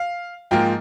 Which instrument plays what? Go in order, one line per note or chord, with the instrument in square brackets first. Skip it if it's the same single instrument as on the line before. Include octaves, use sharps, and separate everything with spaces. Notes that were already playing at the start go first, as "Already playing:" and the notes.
Already playing: [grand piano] F5
G#2 F3 A#3 G5